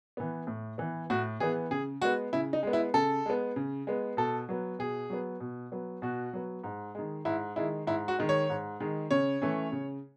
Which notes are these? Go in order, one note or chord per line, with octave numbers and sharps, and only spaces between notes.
E3 B3
A2
E3 B3
A2 F#4
E3 B3 G#4
C#3 G#4
G#3 B3 F#4
C#3 E4
D#4
G#3 B3
E4
C#3 A4
G#3 B3
C#3
G#3 B3
B2 A4
F#3 B3
B2 G#4
F#3 B3
B2
F#3 B3
B2 F#4
F#3 B3
G#2
D#3 G#3
G#2 E4
D#3 G#3 E4
G#2 E4
F#4
D#3 G#3
C#5
G#2
D#3 G#3
C#3 C#5
E3 A3 C#4
C#3